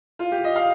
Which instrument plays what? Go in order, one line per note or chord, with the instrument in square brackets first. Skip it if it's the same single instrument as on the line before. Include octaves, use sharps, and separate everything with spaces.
[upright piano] F4
G4
D#5
F5